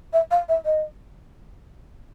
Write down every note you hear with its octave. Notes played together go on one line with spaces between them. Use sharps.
E5
F5
E5
D#5